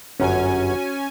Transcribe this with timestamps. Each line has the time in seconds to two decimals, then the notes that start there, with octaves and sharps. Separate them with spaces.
0.20 G1 F#2 C#4 F#4 G#5